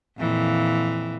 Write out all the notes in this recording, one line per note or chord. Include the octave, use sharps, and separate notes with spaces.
F2 A#2 E3